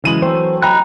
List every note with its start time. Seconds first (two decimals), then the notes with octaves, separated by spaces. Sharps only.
0.04 C#3 E3 F#3 G#3 D#7 F#7
0.22 F#3 A3 C4 C5
0.62 D#4 G5 A#5 B5 F#6